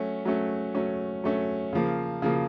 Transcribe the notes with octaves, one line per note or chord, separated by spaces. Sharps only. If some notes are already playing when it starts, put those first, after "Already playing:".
Already playing: F#3 A3 C#4
F#3 A3 C#4
F#3 A3 C#4
F#3 A3 C#4
C#3 F3 A#3
C#3 F3 A#3